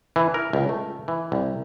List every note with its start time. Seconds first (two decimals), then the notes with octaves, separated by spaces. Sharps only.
0.16 E3
0.34 A#4
0.53 C#2
0.69 A3
1.08 E3
1.32 C2